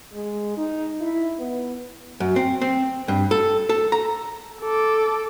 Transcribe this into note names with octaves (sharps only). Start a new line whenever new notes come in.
G#3
D#4
E4
B3
F#2
C4
C4
G2
A4
A4
A#5
A4 D6